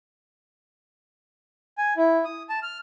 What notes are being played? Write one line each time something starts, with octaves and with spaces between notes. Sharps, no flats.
G#5
E4
D#6
A5
F6